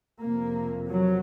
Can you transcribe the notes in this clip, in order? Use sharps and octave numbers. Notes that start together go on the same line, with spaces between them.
F2 C3 A#3
F#3